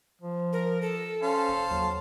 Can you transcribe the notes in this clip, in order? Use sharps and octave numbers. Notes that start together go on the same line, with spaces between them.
F3
A#4
A4
C#4 C5 F5 A5
F#1
D#2 F#3